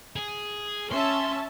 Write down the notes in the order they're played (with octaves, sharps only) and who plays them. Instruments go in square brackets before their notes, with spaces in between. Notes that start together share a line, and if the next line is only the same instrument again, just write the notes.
[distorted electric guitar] G#4
[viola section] C#4 E5 A5 [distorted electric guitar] C6